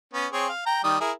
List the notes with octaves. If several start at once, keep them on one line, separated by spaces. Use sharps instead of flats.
B3 C#4
C4 G#4 C#5
F5
G5 A#5
D#3 G3 D#6
E4 G#4 A#4